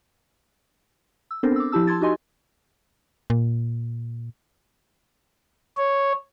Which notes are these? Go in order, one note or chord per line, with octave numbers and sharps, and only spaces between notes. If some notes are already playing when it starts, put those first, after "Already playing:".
E6
B3 C4 D4 A4 A#4 C5
D6 E6
F3 E4 G4 A5 E6
A5 C6 G#6 A6
D#4 F#4 G4 D#5 G#5 C6
A#2
C#5